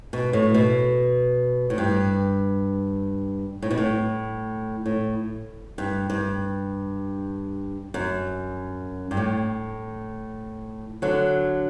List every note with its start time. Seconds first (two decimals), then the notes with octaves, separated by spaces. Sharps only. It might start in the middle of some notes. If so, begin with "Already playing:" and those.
0.13 B2
0.33 A2
0.54 B2
1.70 A2
1.78 G2
3.62 A2
3.71 B2
3.78 A2
4.86 A2
5.78 G2
6.10 G2
7.94 F#2
9.11 G2
9.17 A2
11.02 D3 F#3